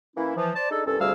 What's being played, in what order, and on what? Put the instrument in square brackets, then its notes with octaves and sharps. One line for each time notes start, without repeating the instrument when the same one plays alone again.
[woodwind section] E3 A#3 C#4 E4
E3 F3
C5 D5 A5
D4 D#4 G#4 A4
C2 G2 C#4 A4
D2 C3 G3 G#4 F5 E6